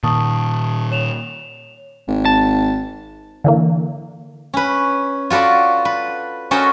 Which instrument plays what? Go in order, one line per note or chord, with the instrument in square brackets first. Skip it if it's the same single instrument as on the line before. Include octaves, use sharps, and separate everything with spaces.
[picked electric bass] A#2 D#3 [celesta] A5 C#6 D#6
[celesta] C#5 E7 F7
[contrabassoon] G#1
[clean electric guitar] A5
[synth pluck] D3 E3 A#3
[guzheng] C#4 B4
F4 F#4 A4 B4 D5
B4
C#4 F#4 A4 A#4 C5 D#5